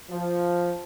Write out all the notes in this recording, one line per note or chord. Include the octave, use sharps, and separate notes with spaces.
F3